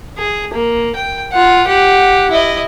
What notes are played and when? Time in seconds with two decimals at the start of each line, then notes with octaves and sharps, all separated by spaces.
0.18 G#4
0.54 A#3
0.96 G5
1.32 F4 F#5
1.67 G4 F#5
2.30 E4 D#5